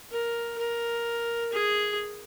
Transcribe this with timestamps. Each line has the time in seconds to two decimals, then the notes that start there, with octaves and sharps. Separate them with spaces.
0.11 A#4
0.58 A#4
1.53 G#4